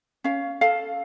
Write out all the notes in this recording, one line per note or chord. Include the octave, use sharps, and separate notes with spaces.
C#4 F5
A4 F5